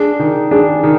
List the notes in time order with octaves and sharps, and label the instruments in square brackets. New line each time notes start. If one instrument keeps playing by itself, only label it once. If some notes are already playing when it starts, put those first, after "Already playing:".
Already playing: [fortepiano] D4 [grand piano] G#4
[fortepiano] D#3
[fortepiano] D4 [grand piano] G#4
[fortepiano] D#3